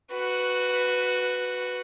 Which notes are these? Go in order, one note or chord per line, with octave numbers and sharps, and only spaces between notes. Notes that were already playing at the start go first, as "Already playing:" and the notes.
F#4 B4